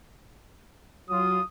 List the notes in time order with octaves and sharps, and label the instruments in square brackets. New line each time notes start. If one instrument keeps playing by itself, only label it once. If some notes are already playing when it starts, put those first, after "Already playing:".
[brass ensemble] F#3 F4 [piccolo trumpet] D#6